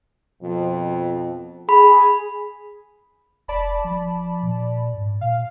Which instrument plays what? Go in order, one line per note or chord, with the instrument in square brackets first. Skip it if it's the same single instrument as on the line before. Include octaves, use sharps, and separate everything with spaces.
[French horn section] F2 B2 F3
[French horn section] G#4 [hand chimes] B5
[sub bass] F1 [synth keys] D5 A5 B5
[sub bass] F3
A#2
G#2
[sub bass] A#2 [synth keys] F5